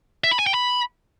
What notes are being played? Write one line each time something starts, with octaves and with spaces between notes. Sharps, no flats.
E5
B5
G#5
G5
B5